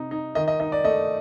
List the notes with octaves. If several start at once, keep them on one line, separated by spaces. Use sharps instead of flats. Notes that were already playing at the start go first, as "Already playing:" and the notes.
Already playing: C3 D#4
D#4
D#3 D#5
D#5
D#4 D#5
D5
A3 D#5